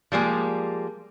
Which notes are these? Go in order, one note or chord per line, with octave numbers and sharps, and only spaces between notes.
F3 G3 G#3 A#3